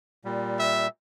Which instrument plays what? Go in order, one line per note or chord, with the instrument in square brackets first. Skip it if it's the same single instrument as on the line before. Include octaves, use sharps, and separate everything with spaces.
[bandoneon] A#2 G3
[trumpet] E5